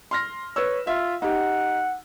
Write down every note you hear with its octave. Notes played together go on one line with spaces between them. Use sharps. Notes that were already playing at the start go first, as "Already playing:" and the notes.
C6 F6 A#6
B4 C#5 E6
F4 E5
D#4 G4 F#5